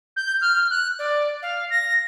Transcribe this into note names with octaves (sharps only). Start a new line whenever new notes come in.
G6
F6
F#6
D5
F5
A#6